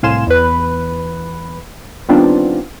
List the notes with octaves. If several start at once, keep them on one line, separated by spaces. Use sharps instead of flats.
C2 A2 F5 G#5 C6 E7
E2 B4
D#3 G3 B3 C4 D4 F4